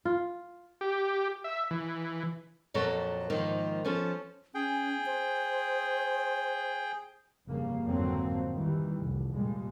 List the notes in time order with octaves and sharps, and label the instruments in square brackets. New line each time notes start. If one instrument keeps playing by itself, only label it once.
[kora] F4
[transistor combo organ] G4
E5
E3
[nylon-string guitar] F2 A#2 F#3 A4 C#5
G#2 D#3 F3 A#3
F3 C#4 A4
[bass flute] C#4 [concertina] G#4 G5
[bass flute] C5
[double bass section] F1 G2 C#3 A#3
G#1 F2 D3 F#3 A#3 C4
D#3 E3 G3
F1 C2
A#1 A#2 G3 G#3